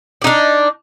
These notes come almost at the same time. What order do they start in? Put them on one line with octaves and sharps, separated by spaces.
D5 D#4 D4